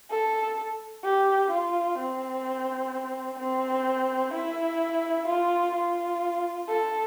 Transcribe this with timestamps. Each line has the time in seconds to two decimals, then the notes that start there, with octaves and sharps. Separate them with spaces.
0.11 A4
1.04 G4
1.51 F4
1.99 C4
3.40 C4
4.34 E4
5.28 F4
5.75 F4
6.69 A4